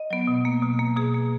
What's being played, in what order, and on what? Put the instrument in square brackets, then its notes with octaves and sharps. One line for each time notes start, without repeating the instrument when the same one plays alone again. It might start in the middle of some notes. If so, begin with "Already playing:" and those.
Already playing: [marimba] D#5
F#3 B3
B2
A#3
B2
A#3
B2 G#4
A#3